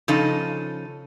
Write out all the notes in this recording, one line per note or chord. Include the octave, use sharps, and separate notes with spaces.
C#3 F3 D#4 A4